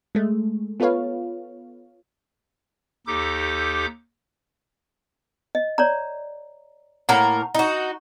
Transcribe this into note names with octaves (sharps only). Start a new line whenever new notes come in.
G#3 A3
B3 F4 A4 B4 C#5 F5
D#2 D#4 G4 A4 D6 G6
D#5
C#5 D5 A#5
A2 A#3 A#4 F#5 A#5
D#4 F#4